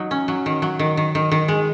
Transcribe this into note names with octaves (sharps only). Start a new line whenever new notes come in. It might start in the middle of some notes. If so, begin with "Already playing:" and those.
Already playing: F#3 D#4
C#4
F#3
D#3
F#3
D#3
D#3
D#3
D#3
G#3